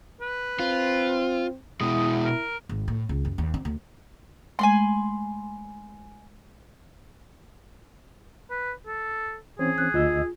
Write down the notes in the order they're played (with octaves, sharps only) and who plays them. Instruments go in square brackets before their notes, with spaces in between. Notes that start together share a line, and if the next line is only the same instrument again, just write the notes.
[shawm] B4
[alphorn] C4 [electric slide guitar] F4
[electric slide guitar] B2 G#3 [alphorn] E4 [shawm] D#6
[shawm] A#4
[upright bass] G#1
A2
C#2
F#2
D#2
C4
D2
[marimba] G#3 A3 [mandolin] G#5 B5 C6
[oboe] B4
A4
[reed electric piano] E3 C4 C#4 [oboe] G#4
[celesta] F#6
[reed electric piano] D2 D#5 E6 [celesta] F4